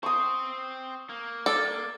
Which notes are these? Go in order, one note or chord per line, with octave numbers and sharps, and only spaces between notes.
C4 C5 C#6 D#6
A#3
A4 D5